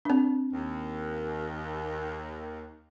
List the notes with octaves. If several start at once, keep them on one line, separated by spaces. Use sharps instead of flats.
C4 D4
D#2